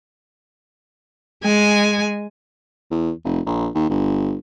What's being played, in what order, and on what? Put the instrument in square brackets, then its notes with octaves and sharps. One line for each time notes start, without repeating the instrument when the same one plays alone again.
[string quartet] G#3 G#5
[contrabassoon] E2
F1
A#1
D#2
G1